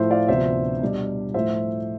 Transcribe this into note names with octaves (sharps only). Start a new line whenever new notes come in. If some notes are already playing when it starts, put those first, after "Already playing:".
Already playing: A2 F3 A3 E4 C5 E5
D5 F5
D2 C3 F3 B3 D4 C5 E5
B2 G3 D4
A2 F3 A3 C5 E5